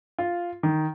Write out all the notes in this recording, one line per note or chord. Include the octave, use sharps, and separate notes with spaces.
F4
D#3